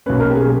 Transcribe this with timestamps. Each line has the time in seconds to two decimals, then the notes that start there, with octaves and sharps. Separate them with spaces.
0.06 B1 B2 A#3 C#4 B4
0.20 A#4
0.30 G4
0.35 G#4